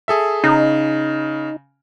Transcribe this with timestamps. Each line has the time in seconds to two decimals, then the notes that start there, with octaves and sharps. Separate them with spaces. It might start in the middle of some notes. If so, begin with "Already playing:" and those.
0.08 G#4 A4 E5
0.44 C#3 D#4